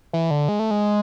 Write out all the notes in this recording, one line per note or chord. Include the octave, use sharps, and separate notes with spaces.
E3
D3
G#3
A3
G#3